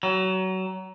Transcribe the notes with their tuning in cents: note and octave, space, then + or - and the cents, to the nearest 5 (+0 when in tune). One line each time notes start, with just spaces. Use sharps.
F#3 +25